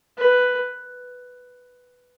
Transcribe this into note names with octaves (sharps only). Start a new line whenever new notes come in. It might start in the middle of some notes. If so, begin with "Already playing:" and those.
B4